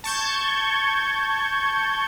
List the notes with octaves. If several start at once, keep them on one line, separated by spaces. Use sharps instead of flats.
A5 C#6 G6 G#6